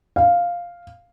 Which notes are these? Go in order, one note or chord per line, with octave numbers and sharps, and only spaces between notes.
F5